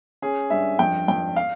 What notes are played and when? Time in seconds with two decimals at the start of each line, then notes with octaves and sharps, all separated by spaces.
0.22 C#4 G#4
0.50 G2 E5
0.79 F2 G5
1.08 F2 G5
1.36 F5